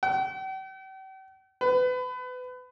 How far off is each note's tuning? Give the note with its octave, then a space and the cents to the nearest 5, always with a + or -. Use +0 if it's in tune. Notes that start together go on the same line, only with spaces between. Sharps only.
G5 -45
B4 +30